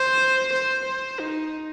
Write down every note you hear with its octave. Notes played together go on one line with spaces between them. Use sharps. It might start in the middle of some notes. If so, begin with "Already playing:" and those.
Already playing: C5
C5
C5
D#4